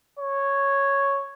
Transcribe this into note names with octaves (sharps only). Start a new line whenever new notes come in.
C#5